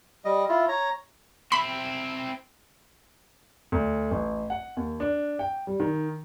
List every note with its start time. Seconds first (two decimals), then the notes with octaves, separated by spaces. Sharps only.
0.25 G3 D#5
0.49 E4 F4
0.68 C#5 A#5
1.52 C4 E4 B5
3.72 D2
4.11 A1
4.50 F#5
4.77 D#2
5.00 D4
5.39 G5
5.67 G3
5.80 D#3